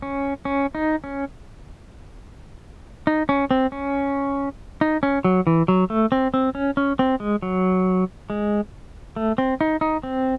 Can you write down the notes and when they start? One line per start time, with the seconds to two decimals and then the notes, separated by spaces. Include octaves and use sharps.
0.02 C#4
0.45 C#4
0.75 D#4
1.04 C#4
3.07 D#4
3.29 C#4
3.51 C4
3.72 C#4
4.81 D#4
5.03 C#4
5.24 F#3
5.47 E3
5.68 F#3
5.90 A3
6.12 C4
6.34 C4
6.55 C#4
6.77 C#4
6.99 C4
7.20 G#3
7.42 F#3
8.30 G#3
9.16 A3
9.38 C4
9.61 D#4
9.81 D#4
10.03 C4